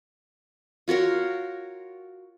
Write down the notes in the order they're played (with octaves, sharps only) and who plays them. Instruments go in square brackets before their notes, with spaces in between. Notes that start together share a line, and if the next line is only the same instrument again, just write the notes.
[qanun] F4 F#4 A#4 C#5